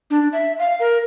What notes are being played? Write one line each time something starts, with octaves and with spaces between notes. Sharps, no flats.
D4
E5
F5
A#4